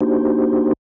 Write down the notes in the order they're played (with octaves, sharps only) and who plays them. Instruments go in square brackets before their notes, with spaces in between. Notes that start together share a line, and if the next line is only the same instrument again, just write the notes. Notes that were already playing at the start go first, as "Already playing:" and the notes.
[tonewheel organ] A#3 D4 D#4 F#4 G4 C5